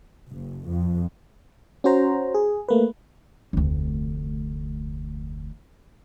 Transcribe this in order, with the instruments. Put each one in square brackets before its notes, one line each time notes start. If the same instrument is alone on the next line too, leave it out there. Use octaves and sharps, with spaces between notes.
[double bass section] F#1
F2
[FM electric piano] C#4 F#4 C5 A#5
G#4
A3 A#3 B4
[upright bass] F1 D2